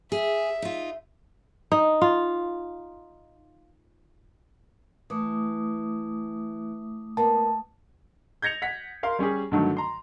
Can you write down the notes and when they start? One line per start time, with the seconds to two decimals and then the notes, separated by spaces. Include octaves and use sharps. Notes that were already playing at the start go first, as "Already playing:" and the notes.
0.12 G#4 E5
0.62 D#4 F4
1.72 D#4
2.02 F4
5.10 E3 A3 D6 D#6
7.17 A#3 B3 A5
8.42 G6 G#6 A#6 C#7 F7
8.62 F#5 B6
9.03 A#4 F5 C6
9.19 G3 C#4 G4 G#4
9.51 G2 D3 D#3 F#3 A3
9.77 A#5 C6